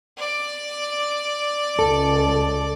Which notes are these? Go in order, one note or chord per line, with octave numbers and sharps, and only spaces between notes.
D5
C#2 A4